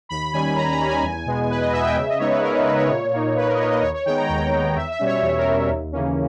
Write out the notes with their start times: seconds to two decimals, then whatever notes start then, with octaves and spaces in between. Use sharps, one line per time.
0.09 D#2 B5
0.33 D#3 G3 C#4 G#5
0.56 D#2 A#5
0.72 A#5
0.80 D#3 G3 C#4
0.87 G#5
1.03 E2
1.26 B2 G#3 B3
1.50 E2 B4
1.61 D#5
1.72 B2 G#3 B3 E5
1.84 G5
1.96 C#3 E5
2.09 D#5
2.19 G#3 B3 D#4 C#5
2.31 B4
2.43 C#3 A#4
2.54 B4
2.66 G#3 B3 D#4 B4
2.77 C#5
2.90 A#2
3.12 A#3 D#4
3.36 A#2 B4
3.47 A#4
3.54 D#5
3.59 A#3 D#4 C#5
3.70 D#5
3.82 D#2 C#5
3.94 C#5
4.06 D#3 G#3 B3 G5
4.17 A#5
4.29 D#2 G5
4.52 D#3 G#3 B3
4.76 E2 E5
4.92 E5
4.99 B2 G3 C#4
5.06 C#5
5.22 E2 C#5
5.38 A#4
5.46 B2 G3 C#4
5.69 D#2
5.92 C#3 E3 A#3 C#4